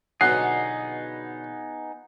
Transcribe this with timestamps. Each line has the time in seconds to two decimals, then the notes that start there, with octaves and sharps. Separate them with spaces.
0.21 B2 D3 F#3 B3 D#4 G#4 F#5 C7